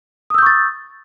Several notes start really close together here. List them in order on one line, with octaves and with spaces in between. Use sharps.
D#6 E6 G6 C#6 A6